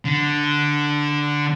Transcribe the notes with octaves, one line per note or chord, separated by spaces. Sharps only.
D3